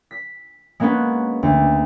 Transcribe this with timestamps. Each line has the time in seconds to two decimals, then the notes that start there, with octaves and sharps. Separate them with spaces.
0.11 B6
0.80 G#3 A#3 B3 C#4 F#4
1.43 D2